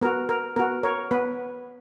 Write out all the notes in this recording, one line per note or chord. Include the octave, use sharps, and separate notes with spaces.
B3 F#4 A#4
A#4
B3 F#4 A#4
A#4 C#5
B3 B4